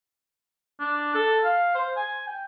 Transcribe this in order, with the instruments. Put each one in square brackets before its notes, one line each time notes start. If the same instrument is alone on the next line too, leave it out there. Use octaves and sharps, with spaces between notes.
[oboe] D4
A4
F5
C5
G#5
G5